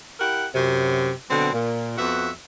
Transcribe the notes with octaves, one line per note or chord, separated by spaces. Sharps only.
E4 G4 A#4 F#5
F#2 C3
B2 D3 F#3 C4
A#2
F2 B3 F#4 E5